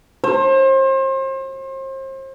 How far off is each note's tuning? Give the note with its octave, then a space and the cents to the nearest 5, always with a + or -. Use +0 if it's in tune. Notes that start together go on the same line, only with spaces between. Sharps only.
C5 +35